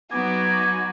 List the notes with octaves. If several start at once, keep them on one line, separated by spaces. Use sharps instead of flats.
F#3 B3 D#4 F#4 G#5 D6